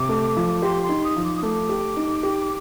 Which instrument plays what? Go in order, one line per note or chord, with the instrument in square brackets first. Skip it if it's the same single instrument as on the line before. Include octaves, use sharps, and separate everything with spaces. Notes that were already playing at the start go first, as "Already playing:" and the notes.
Already playing: [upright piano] C3 [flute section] D6
[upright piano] A3
F3
[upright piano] G4 [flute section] C6
[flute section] C6
[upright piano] D#4
[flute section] D#6
[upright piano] F3
[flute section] D6
D#6
[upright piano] A3 [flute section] D6
[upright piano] G4
D#4
G4